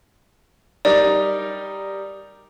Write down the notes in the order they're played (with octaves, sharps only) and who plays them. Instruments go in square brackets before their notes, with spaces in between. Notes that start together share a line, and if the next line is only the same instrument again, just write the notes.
[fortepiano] G3 D#4 A#4 [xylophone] D5